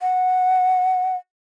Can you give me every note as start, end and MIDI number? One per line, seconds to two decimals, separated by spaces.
0.01 1.16 78